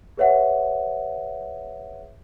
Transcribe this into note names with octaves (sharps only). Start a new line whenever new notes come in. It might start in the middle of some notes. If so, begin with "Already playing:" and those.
G#4 B4 C#5 E5 F#5